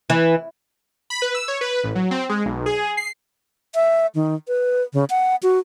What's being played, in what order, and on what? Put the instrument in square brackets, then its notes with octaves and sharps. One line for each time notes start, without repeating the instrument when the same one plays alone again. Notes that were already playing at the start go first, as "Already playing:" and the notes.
[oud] E3
[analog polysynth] B5
B4
E6
C#5
B4
A1
F#3
C4
G#3
B1
G#4
C7
[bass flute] E5
D#3
B4
C#3
F#5
F#4